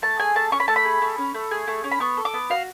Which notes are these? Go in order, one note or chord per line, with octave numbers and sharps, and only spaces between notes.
A3 A5
G#4 G#5
A3 A5
C#4 C#6
B5
A3 A5
B5
G#4
A3
C#4
A3
G#4
A3
C#4
B5
B3 C#6
A4
D6
B3
F#4 F5